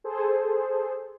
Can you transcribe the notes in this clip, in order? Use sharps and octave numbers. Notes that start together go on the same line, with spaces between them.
G#4 A4 C5